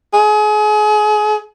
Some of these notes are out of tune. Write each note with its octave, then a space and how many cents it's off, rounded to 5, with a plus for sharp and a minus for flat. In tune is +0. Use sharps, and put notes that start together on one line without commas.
G#4 +30